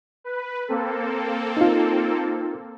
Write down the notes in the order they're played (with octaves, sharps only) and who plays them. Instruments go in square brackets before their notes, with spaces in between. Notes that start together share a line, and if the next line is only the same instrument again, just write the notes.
[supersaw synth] B4
A#3 C4 A4
[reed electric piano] D#4 F4